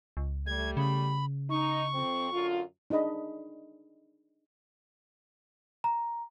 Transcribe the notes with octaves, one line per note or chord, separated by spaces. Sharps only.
C#2
G3 A3 G#6
C#3 B5
D#4 C#6
F2 C4
F#2 D3 F4
D4 D#4 G#4 D#5 B5
A#5